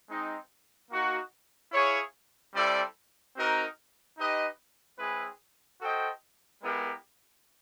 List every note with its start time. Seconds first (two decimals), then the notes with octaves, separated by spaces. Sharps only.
0.09 G#3 C4 D#4
0.90 A#3 D#4 F#4
1.72 E4 G#4 C#5 F5
2.54 G3 C4 E4 A4 D5
3.35 C4 D#4 F#4 A#4
4.17 D#4 G4 B4 D#5
4.98 G#3 C4 E4 G#4 B4
5.81 F#4 A4 C5 D#5 G5
6.62 G#3 B3 E4 G4 A#4